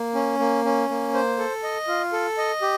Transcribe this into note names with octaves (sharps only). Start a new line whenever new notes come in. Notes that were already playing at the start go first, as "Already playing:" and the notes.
Already playing: A#3
C#4
A#3
C#4
A#3
C5
A4
D#5
F4
A4
D#5
G4